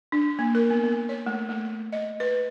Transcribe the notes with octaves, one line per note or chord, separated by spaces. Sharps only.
D4
A#3
A#4
B3
B3
C#5
A3
A3
D#5
B4